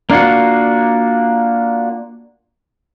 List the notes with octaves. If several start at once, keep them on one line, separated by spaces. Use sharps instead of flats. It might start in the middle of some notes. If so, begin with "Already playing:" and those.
A#3 D4 F4 F#4